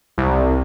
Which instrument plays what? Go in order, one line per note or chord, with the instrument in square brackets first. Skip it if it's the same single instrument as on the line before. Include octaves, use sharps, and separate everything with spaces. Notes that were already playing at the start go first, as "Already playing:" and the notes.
[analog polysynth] C2